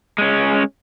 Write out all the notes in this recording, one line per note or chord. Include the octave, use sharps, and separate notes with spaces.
G#3 C#4